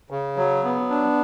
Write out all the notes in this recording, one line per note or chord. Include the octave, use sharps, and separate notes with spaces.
C#3
F#3
B3
D4